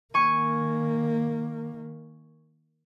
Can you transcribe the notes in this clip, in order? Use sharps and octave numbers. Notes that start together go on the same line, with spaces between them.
D#3 A#3 G#5 C#6